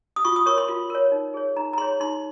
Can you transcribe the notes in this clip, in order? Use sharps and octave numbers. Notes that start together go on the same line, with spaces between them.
D#6
F4 C#6
D#6
A#4 C#5 C#6
C6
F4 C6
A#4 C#5
D#4
G#4 C#5
D#4 A#5
A#5
G#4 C#5 C6
D#4 C6